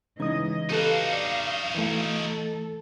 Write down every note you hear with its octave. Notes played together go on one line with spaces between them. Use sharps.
C#3 E3 G#3 D#4 D#5 D#6
D#4 F#4 G4 A4 B4 F5
D5
E3 A3
A4